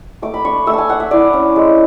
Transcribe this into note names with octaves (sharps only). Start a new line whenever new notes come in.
A3 D6
B5
D4 C#6
A3 E6
G#5 A5
D4 F#5
E5
E4 D5
C#4
G#3